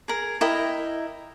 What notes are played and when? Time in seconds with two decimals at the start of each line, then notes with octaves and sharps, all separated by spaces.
0.08 G#4 A#4
0.41 E4 A#4 D#5 G5